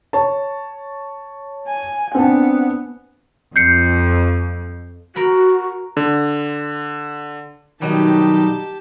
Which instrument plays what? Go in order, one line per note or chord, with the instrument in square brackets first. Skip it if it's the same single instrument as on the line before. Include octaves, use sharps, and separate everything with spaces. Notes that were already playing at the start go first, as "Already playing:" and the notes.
[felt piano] C#5 A5
[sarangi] G#5
[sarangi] B3 [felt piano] C4 D4
[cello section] F2 [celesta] G6 C7 C#7
[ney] F#4 [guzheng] A#4 B5
[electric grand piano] D3
[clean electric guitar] B1 F#3 G3 [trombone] D#3 [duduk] D#4 [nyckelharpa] G4 A5